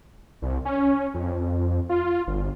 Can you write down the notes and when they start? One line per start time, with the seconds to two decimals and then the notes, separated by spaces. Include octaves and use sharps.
0.42 C2
0.65 C#4
1.14 F2
1.89 F4
2.27 G1